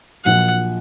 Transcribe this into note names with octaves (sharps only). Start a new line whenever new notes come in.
A#1 A#2 F#3 F#5